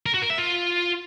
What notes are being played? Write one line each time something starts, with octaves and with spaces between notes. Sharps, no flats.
A#4
F#4
A#4
E5
F4